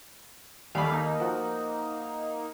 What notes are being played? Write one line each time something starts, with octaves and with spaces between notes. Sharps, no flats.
D#2 G3 A3 F5 B5
A#3 D#4
F3 F#4